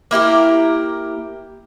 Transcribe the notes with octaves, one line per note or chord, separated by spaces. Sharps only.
A#3 E4 G4 A#4